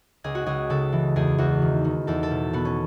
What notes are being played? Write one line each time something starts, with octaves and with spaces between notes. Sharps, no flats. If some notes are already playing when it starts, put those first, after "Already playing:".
C#2 G#4
F#4
C#2 G#4
C#3 A4
E3
E2 G#4
E2 F#4
D#3
D#3
E2 A4
A4
B2
B2 B3
C#4